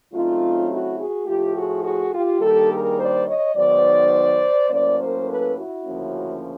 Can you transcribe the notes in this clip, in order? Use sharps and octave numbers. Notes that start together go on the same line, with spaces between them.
C#3 F#3 A3 C4 D#4 F4
E4 F#4
F#4 G#4
A2 F3 A3 F4 G4
F#4 G#4
F#4 G#4
F4 G4
G2 D#3 G3 A#3 G4 A4
G#4 A#4
C5 D5
C#5 D#5
G#2 D#3 F#3 B3 C5 D5
A2 F#3 A#3 C#4 C5 D5
A#4 C5
A4 B4
E4 F#4
D2 C#3 F3 A#3 C#4